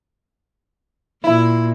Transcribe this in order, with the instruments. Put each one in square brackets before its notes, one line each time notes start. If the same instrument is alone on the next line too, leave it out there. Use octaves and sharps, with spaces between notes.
[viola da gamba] A#2 [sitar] E4